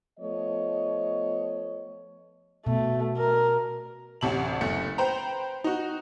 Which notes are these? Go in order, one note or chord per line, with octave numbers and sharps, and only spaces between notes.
F3 A3 B3 C#5 D#5
B2 A3
A#4
A1 D2 C3 A5 F#7
F#1 A3 C#7
B4 C5 G5 A#5
D#4 F#4